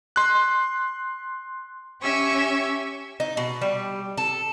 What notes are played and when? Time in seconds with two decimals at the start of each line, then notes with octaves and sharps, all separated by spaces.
0.16 C6 F#6
2.01 C#4 G4 E5 G#5 C#6
3.20 D#4
3.37 B2
3.61 G3
4.17 A4